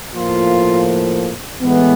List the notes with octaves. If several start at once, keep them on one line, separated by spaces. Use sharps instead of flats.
A2 F3 A#3 F4
A2 E3 G#3 B3